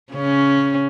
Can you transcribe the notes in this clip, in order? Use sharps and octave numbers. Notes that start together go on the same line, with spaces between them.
C#3 C#4